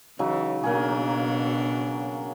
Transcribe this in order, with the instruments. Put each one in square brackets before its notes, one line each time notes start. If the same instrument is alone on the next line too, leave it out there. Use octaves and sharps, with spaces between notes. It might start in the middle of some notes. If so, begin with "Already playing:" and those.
[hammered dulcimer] C#3 F#3 D#4 [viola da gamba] E3
[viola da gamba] B2 D4 [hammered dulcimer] F#3 A#3 G#4